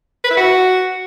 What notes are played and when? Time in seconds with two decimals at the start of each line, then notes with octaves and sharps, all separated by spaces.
0.24 B4
0.30 E4
0.37 F#4